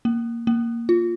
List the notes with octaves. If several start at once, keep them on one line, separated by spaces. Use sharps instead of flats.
A#3
A#3
F4